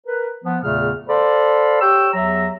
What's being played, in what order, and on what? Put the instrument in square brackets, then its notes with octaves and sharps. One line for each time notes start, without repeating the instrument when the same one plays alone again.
[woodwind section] A#4 B4
F3 B3
E2 A#2 C#3 A3 F6
A4 C5 D5 F5 B5
G4 C#5 G5 E6
E2 F#3 E5 A#5